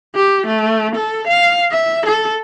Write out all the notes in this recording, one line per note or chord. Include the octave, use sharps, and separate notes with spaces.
G4
A3
A4
F5
E5
A4